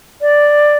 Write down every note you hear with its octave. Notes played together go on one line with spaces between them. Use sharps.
D5